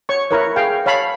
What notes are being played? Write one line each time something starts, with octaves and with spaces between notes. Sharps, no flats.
C#5 C#6
E4 A#4 B4 C#5
G#4 F5 G5
C#5 F5 A5 B5